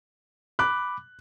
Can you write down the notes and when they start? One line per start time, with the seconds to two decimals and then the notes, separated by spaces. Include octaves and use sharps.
0.59 B5 D6 F#6